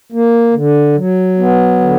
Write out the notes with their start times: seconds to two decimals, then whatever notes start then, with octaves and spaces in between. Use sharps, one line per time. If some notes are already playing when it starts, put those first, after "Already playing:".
0.12 A#3
0.54 D3
0.96 F#3
1.38 B3
1.80 D3